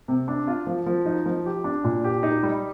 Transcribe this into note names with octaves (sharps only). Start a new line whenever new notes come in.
C3
D4
F4
F3
F3
D#4
F3
G4
D4
A#2
G4
D#4
G3